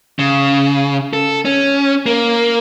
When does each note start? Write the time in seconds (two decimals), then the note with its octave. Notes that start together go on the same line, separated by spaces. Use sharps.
0.19 C#3
1.13 A4
1.45 C#4
2.06 A#3